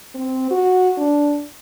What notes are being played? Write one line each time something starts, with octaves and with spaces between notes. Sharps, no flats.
C4
F#4
D4